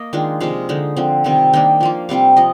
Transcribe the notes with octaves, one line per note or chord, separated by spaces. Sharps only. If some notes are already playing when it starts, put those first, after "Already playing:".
Already playing: A#3 D#5
D#3 G#3 D4 F4
C3 F3 G#3 F5
D3 G#3 D#4
D3 F3 C4
C3 D#3 G3 C4
D#3 A#3 D4 G5
F3 A#3 F4
C3 G3 C4 F4 F5
F3 D#5